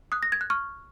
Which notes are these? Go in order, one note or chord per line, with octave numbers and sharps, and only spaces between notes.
D#6 F#6
A#6
G#6
F#6
C#6 F6